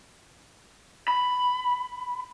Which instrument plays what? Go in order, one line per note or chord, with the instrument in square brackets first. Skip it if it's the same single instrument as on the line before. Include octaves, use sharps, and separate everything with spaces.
[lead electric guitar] B5